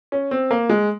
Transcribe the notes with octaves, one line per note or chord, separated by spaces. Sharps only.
C#4
C4
A#3
G#3